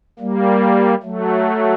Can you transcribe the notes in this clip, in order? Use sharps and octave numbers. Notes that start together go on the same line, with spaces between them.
G3 A#3
F#3 A3